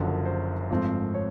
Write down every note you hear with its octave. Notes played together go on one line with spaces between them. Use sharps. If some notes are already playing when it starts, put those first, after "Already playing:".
Already playing: F#1 F#2 D3 F3
C5
G#1 G#2 F3 A3 C4
C#5